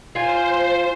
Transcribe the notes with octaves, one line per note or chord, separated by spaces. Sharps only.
F4 C5 G#5